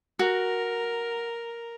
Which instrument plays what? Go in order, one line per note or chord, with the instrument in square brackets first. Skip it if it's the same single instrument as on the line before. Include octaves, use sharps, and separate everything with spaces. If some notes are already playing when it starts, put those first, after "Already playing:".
[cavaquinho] F#4 [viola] A#4